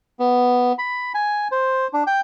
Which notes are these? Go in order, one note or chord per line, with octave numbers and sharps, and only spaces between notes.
B3
B5
G#5
C5
D4
G5